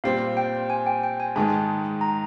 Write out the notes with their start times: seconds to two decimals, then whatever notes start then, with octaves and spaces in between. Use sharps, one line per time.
0.04 A#2 G3 C4 F5
0.37 G5
0.70 G#5
0.86 G5
1.03 G5
1.20 G#5
1.36 G#2 D#3 G#3 A5
2.01 A#5